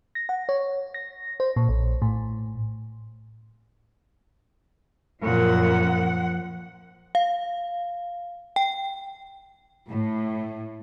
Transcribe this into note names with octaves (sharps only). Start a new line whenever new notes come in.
A#6
F#5
C#5
A#6
C5
A#2
A#1
A2
F#2 A#2 F3 F#5
F5
G5
A2